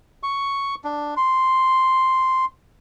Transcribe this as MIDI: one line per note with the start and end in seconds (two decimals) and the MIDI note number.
0.23 0.75 85
0.84 1.14 62
1.17 2.45 84